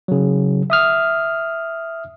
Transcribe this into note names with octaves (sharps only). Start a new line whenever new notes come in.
C#3 F#3
E5 D#6 F6